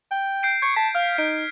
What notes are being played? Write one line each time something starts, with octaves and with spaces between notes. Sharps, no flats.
G5
G6 C7 D7
C#6 G#6
A5 B6
F5 F6
D#4 D7